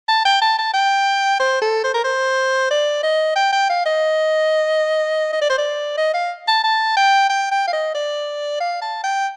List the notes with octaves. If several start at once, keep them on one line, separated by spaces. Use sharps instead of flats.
A5
G5
A5
A5
G5
C5
A4
C5
A#4
C5
D5
D#5
G5
G5
F5
D#5
D#5
D5
C5
D5
D#5
F5
A5
A5
G5
G5
G5
F5
D#5
D5
F5
A5
G5